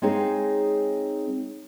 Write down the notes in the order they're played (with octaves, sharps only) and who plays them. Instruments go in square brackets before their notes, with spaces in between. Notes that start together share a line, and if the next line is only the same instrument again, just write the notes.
[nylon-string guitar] G#3 C4 D#4 G#4 C#5 F5